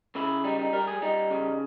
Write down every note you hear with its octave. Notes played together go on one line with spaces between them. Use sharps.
C#3 E4
G3 D#4
D#4
G3 A#4
G#4
G3 D#4
C#3